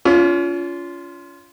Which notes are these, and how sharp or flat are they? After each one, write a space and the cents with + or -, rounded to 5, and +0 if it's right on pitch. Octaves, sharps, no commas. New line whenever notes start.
C#4 +40 F4 -10